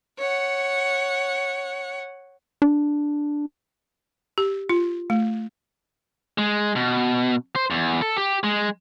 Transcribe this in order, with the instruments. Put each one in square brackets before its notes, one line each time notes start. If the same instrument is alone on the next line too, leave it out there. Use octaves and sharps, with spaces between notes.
[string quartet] C#5 F#5
[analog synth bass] D4
[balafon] G4
F4
A3
[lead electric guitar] G#3
B2
C5
E2
A4
G4
G#3